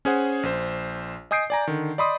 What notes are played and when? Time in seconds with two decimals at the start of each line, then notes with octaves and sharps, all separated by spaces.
0.05 C#4 G#4 C5 F#5
0.43 A#1 C5
1.31 D#5 G#5 D#6 G6 C7 D7
1.50 D5 G#5 A#5
1.67 D3 D#3
1.98 D5 D#5 B5 C6 D#6